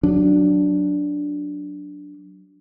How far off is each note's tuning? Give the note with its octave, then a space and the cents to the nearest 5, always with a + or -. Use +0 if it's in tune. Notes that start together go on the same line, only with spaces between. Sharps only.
F#3 +0 D4 +0